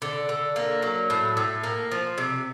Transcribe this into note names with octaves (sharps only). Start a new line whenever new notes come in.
D3
D3
A#3
F#3
A2
A2
A#3
F3
C3